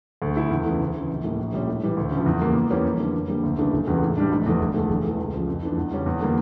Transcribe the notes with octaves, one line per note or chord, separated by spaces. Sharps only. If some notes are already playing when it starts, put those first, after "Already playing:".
D2
D3 A3 E4
E2
C#3 E3 A3
D2
C#3 E3
A#1
A2 G3 A#3
A#1
A#2 G3 C#4
A2
E3 G3
D2
C#3
F3
E2
C#3 G3 A#3
E2
E3 G3 A#3 C#4
F2
D3 A3 E4
F2
D3 G3 A#3
D2
C#3 E3 A3 D4
E1
E2 C#3 E3 G3
A2
G3 D4
F1
E2 E3 A3
E1
E2 D3 A3
E1
E2 E3 A3
C#2
C#3 F3
F2
E3 A3 D4
E2
C#3 G3 C#4
E2
D3 G3 A#3 D4